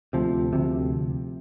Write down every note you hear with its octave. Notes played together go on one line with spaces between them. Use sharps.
D2 C3 F3
D2 C3